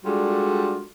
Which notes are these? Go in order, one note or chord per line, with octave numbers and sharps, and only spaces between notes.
G3 G#3 D4 F4 F#4 A4